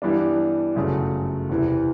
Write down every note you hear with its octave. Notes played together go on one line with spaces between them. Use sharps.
G2 E3 G3 B3 D4
G1 F#2 C#3 F#3 A3
E2 C3 E3